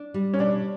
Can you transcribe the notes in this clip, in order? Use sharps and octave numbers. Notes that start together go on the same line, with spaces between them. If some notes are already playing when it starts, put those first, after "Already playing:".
Already playing: D4
G3
C#4
B2 D4